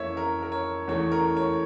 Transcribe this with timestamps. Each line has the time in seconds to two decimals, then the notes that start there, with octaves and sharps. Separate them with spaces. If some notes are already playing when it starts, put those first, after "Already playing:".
Already playing: F2 E3 A#3 C#5 E5
0.17 A#4
0.42 A#4
0.52 C#5
0.88 E2 E3 A3 C#5
1.12 A#4
1.37 C#5